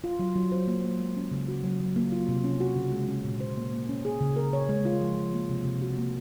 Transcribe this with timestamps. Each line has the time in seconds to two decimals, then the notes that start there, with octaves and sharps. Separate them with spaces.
0.04 F4
0.19 F#3
0.36 F#3
0.52 C5
0.68 A#3
0.84 A#3
1.00 G#3
1.16 C#4
1.31 C#3
1.48 F#4
1.64 F#3
1.80 F#3
1.96 A#3
2.12 F4
2.29 C3
2.44 C#4
2.60 F#4
2.76 C#3
2.92 G#3
3.09 C#4
3.24 A#2
3.41 C5
3.57 A#3
3.73 A#3
3.89 C#4
4.05 G#4
4.21 C#3
4.36 A#4
4.53 C#5
4.69 G#3
4.85 F4
5.01 F3
5.18 F3
5.33 A#3
5.49 C3
5.65 C3
5.82 F#4
5.98 A#3